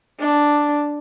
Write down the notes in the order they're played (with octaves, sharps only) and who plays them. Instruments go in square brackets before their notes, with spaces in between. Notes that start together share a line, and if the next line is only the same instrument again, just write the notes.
[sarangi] D4